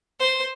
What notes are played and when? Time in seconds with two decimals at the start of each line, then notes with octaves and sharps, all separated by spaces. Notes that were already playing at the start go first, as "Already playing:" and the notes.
0.20 C5